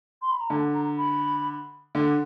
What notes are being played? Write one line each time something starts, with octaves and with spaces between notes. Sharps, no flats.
C6
B5
A#5
D3 A5
A#5
B5
D3